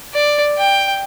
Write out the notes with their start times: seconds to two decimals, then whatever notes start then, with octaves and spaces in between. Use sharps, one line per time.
0.14 D5
0.57 G5